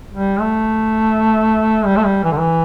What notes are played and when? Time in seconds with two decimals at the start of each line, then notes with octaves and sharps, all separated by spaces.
0.12 G3
0.40 A3
1.85 G3
1.97 A3
2.05 G3
2.24 E3
2.32 D3
2.39 E3